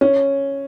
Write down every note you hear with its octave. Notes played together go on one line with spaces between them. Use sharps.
C#4